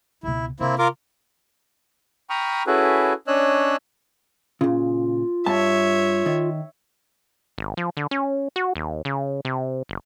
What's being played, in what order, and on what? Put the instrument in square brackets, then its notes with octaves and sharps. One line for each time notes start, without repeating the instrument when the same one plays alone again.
[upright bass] C#2 B2 [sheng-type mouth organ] E4
[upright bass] C3 [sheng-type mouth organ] A#3 C4 E4
[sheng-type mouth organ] F4 A#4 D6
G5 A#5 B5 C#6 D#6 F6
C#4 E4 F#4 G#4 A4 B4
C#4 D4 C#5 D#5 E6 F#6
[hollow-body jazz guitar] A#2 C#3 [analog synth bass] F4
[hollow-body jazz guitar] G2 A5 [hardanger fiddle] C#5 E5
[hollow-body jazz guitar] D#3
[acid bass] G#1
F3
D3
C#4
F#4
D#2
C#3
C3
F#1